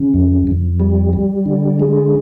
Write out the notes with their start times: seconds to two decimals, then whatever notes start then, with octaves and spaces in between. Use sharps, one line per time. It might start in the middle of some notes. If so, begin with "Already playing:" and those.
Already playing: C#3
0.14 F2
0.47 F2
0.80 G3
1.13 G3
1.46 D3
1.80 G#3